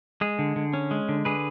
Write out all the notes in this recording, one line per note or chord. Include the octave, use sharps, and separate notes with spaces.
G#3 G#4
D3
D3
C#4
G#3
D3
D3 G#4 B4